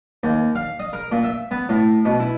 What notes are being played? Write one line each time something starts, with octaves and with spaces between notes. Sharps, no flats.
D#2
F5
D#5
A#4
A#2
E5
B3
A2
B2
E4